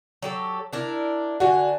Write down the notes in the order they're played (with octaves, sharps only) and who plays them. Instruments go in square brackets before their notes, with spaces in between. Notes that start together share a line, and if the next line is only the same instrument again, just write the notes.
[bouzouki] F#3 G4 A4
D4 E4 A#4
[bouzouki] D3 G#5 [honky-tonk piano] F#4